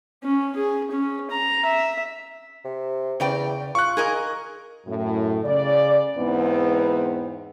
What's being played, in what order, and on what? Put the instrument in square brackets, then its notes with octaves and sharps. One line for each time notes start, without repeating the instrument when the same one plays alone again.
[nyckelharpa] C#4
G#4
C#4
A#5
E5
[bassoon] C3
[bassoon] E2 [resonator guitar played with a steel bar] C#3 D5 G5
[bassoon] F4 [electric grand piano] C#6 F#6
[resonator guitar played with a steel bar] G#4 A#4 D#5
[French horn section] F#2 A2
C#3 D5
E2 G#2 B3 C4